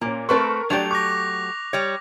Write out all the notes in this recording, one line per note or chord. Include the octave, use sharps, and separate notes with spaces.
A#2 A#3 C#4
A3 C4 A#4 B4 C#6
F#3 A3 D4 G4 D5 G6 F7
C#6 D6 F#6 A#6
G3 C#5